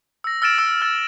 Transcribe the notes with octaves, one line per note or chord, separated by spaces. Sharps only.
E6 A#6
E6 F6 A6 D7 E7
E6
E6 F6 A6